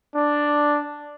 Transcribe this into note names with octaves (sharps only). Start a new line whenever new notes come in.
D4